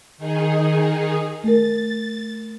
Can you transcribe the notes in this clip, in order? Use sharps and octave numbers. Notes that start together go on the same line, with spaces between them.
D#3 D#4 G#4
A3 A#4 A6